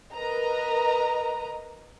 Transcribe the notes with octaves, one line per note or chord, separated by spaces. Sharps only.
A#4 B4 D#5 A#5